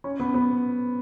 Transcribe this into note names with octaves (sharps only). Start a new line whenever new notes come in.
C#4
B3
B3